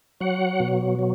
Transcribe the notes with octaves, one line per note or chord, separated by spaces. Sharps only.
F#3 F#5
B2
F#3